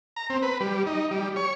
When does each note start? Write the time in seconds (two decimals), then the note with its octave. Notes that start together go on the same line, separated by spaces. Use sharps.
0.16 A#5
0.30 C4
0.42 B4
0.60 G3
0.86 D#4
1.11 G3
1.36 C#5